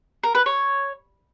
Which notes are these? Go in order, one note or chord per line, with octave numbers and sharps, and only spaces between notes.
A#4
B4
C#5